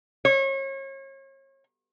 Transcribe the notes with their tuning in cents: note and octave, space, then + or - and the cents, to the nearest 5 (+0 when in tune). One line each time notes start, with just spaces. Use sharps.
C#5 -35